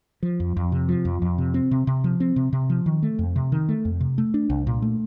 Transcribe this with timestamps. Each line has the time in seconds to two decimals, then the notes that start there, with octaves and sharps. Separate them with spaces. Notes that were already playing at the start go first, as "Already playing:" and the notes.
0.23 F3
0.40 F2
0.57 F2
0.72 C3
0.89 F3
1.05 F2
1.22 F2
1.38 C3
1.54 C4
1.71 C3
1.87 C3
2.04 F3
2.20 C4
2.36 C3
2.53 C3
2.70 F3
2.86 D#3
3.03 A3
3.19 F2
3.36 C3
3.52 D#3
3.69 A3
3.85 F2
4.00 C3
4.18 A3
4.34 D4
4.50 C2
4.67 A#2
4.82 A3